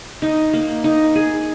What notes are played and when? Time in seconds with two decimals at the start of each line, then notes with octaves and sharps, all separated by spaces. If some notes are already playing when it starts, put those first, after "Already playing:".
0.22 D#4
0.53 A#3
0.84 D#4
1.16 G#4